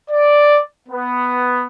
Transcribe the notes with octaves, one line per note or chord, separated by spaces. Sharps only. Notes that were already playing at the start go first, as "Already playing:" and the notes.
D5
B3